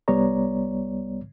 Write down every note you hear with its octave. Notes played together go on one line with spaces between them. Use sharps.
C2 G3 B3 C#5 D5 A#5